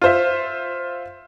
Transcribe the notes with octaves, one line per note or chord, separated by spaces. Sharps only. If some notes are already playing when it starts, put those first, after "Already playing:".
F4 C5 E5